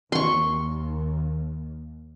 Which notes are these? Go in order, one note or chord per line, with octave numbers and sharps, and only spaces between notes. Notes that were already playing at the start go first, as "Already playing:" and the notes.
D#2 C6 C#6